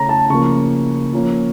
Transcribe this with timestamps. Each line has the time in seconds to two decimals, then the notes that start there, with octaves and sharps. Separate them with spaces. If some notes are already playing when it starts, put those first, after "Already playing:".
Already playing: C#3 A3 C#4 A#5
0.09 A5
0.30 C#3 F3 A#3 C#6
1.13 F3 A#3 C#4